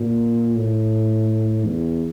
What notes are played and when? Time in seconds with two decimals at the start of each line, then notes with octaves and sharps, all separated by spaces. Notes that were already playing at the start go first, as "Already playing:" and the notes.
Already playing: A#2
0.57 A2
1.65 E2